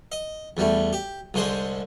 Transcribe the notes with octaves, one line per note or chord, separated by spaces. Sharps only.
D#5
E2 G3 A3
G4
C2 D3 G#3 C5 D#6